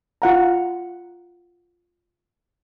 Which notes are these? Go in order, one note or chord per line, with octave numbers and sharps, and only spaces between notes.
F4 F#5 A#5